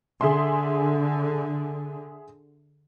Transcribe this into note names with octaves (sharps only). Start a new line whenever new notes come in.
D3 G#4 E5 C6